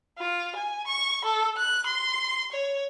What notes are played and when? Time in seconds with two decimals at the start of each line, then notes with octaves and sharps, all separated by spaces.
0.18 F4
0.56 G#5
0.87 C#6
1.25 A4
1.57 F#6
1.86 C6
2.52 C#5